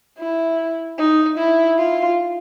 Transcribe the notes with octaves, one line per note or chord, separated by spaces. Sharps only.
E4
D#4
E4
F4